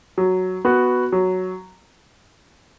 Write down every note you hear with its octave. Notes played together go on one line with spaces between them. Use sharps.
F#3
B3 F#4
F#3